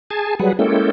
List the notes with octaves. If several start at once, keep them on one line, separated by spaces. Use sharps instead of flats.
G#4 G#5 A5
F#3 G3 G#4 B4 F#5
G#3 A#3 C#4 E4 A4 G5